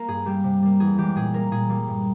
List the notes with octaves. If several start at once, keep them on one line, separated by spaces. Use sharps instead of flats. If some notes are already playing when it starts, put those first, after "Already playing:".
Already playing: A#3 A#4
G2 G#4
G3 A#3 G4
C3
G3 A#3
E2 G#4
E3 G#3 G4
A#2 G#4
G3 A#3 A#4
A#2 G#4
G3 A#3
G2